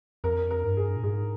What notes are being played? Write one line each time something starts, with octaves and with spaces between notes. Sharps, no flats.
F2 A#4
A#4
G2
G#4
A#2
G#2 G#4